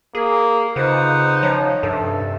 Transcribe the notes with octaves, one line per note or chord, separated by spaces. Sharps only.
A#3 G#4
F2 C#3 D#4 B4 C5 F#5
F3 C#4
G2 C3 A4